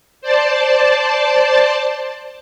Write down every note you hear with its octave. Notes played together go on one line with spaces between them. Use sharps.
C5 D5 A5